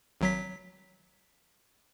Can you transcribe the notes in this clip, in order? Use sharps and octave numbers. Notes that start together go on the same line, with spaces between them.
G#1 F#3 B6